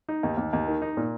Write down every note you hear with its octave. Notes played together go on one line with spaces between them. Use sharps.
D#4
D#2
D#2
D#2
D#3
D#4
A#2